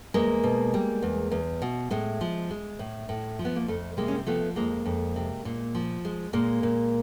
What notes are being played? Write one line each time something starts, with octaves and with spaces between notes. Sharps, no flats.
E2 G#3 A#3
B2
G3
E2
E2
B2
A2 G#3
F3
G#3
A2
A2
F3
B3
A#3
F2 A3
C3 G#3 A#3
C#4
C4
F3 A3 B3
F2 G#3 A#3
F2
C3
A#2
F3
G#3
A#2 G#3 A#3
A#2